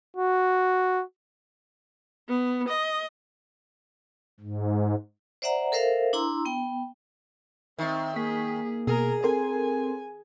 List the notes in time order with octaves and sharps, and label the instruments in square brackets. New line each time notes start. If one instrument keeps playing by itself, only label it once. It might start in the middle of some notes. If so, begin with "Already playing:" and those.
[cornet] F#4
[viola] B3
D#5
[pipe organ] G#2
[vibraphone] C5 D5 E5 F#5 A#5
A4 A#4 C5 E5 F5
D4 E4 A#5 C6 E6
B3 G5
[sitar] D#3 [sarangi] C4 [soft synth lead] E5
[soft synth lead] A#3 [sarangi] G#4 [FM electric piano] B6
[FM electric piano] B2 [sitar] G#4 [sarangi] A#4
[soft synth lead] C4 [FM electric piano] A4 A#4 C6 [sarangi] G#5